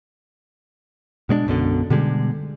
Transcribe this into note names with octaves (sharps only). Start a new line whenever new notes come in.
B2 G#3 C4 D4
B1 F#2 B2 D3
B2 D3 G3 G#3